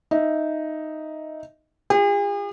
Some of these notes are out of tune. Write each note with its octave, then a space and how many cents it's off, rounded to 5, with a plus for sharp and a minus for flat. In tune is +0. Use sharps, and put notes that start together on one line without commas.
D#4 +0 E5 +0
F4 +0 G#4 -45